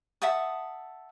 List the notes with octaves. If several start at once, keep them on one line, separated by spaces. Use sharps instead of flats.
E5 F#5 A5 D#6